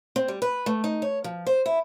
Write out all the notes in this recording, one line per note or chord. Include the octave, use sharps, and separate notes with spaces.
C4
G3
B4
A3
D#4
C#5
F3
C5
E4